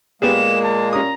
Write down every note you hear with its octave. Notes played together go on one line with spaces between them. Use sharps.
A#2 G#3 A#3 B3 G4 G#4 E7
A5
C#4 A#5 D#6